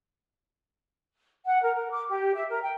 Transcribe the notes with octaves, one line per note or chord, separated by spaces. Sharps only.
F#5
A#4
A#4
D6
G4
E5
A#4
G5